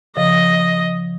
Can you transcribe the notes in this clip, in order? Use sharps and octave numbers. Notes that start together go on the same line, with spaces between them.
C#3 F3 D#5